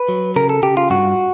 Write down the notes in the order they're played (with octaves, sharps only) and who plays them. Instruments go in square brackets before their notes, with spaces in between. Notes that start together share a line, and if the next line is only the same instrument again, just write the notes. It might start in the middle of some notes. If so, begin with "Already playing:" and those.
Already playing: [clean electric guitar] B4
F#3
C#3 A#4
A4
C#3 G4
F4
G2 F#4